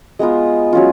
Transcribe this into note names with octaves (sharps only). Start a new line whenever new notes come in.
G#3 B3 F4 A#5
F#3 C#4 F4